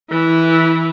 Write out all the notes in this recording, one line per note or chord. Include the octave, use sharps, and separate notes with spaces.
E3 E4